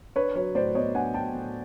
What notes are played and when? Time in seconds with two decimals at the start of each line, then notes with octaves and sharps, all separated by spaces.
0.16 D4 B4 C#5
0.35 F#3 B4 C#5
0.55 A2 C5 D5
0.75 B3 C#5 D#5
0.95 D4 F#5 G#5
1.14 F#3 G5 A5
1.34 A2